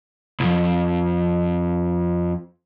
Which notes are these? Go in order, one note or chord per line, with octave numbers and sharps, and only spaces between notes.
C2 F2